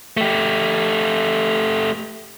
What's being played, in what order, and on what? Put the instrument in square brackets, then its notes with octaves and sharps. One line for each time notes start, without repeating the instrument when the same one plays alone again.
[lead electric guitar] A3 G4